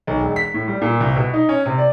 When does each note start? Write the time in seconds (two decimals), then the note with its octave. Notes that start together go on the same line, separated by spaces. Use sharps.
0.07 B1
0.20 E1
0.36 B6
0.54 A2
0.68 G3
0.81 A#2
1.00 C2
1.16 B2
1.34 D#4
1.49 C#4
1.66 C3
1.78 D5